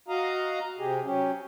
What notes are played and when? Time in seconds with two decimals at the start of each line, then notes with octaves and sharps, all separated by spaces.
0.08 F#4 D#5 F5 A#5
0.79 C3 G4 G#4
1.04 F#3 C#4 G4